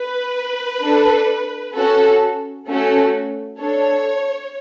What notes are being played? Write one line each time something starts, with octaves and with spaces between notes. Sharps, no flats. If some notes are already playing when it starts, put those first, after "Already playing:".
Already playing: B4
D4 A4
C#4 F#4 A4
A3 C#4 F#4 A4
D4 A4 C#5